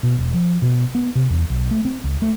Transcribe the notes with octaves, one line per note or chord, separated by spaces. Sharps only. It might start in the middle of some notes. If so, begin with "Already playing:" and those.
B2
E1
F3
B2
B3
C3
E2
B1
A3
C4
C#2
A3